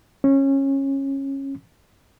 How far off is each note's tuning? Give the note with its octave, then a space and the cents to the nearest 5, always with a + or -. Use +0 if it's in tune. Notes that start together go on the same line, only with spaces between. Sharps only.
C#4 -20